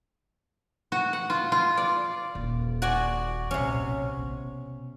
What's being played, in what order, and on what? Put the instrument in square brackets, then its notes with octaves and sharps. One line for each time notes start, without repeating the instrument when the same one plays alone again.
[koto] F#4
F#5
F4
F4
D5
[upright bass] D#1
[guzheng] F#4 D5 G#5
[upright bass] D#1 B1 [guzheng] C3 C#4
[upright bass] B2